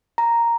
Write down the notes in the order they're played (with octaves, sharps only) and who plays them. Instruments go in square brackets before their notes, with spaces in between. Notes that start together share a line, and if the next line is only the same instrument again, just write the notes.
[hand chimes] A#5